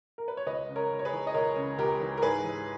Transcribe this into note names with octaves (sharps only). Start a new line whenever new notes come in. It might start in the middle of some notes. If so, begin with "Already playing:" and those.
A#4
B4
C#5
C#2 B4 D#5
C#3
A#4 C#5
C#2
C#5
G#4 B4
E3
D#5
C#2 A#4 C#5
C#3
C#2 G4 A#4
E3
A#4
G#2 G#4 B4
E3